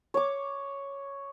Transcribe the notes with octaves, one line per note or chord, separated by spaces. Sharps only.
C#5 D6